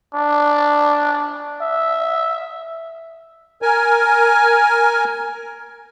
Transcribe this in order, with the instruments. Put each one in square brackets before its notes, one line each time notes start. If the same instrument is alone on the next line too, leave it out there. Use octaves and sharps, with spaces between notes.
[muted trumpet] D4
E5
[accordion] A#4 G#5